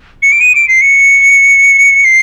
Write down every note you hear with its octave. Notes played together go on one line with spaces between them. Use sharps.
C#7
D7
D#7
D7
C7
C#7
C7